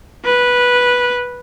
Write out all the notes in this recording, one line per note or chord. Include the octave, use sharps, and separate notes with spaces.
B4